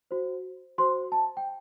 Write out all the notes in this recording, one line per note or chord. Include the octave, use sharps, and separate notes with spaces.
F#4 C5
F#4 C5 C6
A5
G5